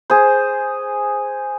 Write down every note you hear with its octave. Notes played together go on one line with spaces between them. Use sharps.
G#4 C5